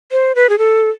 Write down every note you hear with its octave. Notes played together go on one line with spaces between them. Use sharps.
C5
B4
G#4
A4